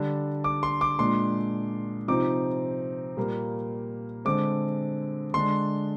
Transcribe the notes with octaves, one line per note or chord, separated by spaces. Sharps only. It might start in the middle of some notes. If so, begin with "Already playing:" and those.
Already playing: D3 G3 D4
D6
C6
D6
A#2 G#3 D4 C6
C3 F3 C4 D#4 D6
A#2 G3 A#3
D3 G#3 C4 D6
D3 G#3 D4 C6